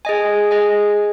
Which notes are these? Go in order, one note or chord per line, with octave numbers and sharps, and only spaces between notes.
G#4 D#5 G#5
G#4 D#5 G#5